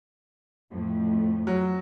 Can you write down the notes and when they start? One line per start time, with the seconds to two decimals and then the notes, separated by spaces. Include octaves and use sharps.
0.70 F2 A2 A3
1.47 F#3